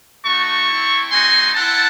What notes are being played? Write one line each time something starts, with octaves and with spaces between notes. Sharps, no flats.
A3 D#4 F#4 A5 C#6
C4 E4
A3 D#4 F#4 G#5 C6
C4 E4 F#5 A5